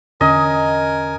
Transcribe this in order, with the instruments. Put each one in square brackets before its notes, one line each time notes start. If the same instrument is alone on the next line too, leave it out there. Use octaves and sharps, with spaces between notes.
[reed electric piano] E2 D3 C#4 [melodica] A#4 G#5 [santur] D#5